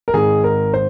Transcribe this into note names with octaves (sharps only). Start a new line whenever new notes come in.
A#4
G#1 G#2 D#3 G#4
A#4
C5